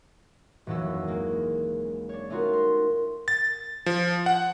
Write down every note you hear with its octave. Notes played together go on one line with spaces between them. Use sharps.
D#1 F#2 E3 C#4 E6
G#3 A#3
D4 C#5
A3 C#4 D#4 F4 F#4 A#4
C6
A6
F3
F#5